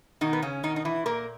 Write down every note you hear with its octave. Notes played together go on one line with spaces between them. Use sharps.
B2 D#3 D#4
B3
C#3 C#4
B2 D#3 D#4
D#4
E3 E4
A#2 A#3 A#4